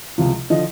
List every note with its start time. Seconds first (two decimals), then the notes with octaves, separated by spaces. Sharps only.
0.18 C#2 C3 F3
0.50 D3 F3 D#5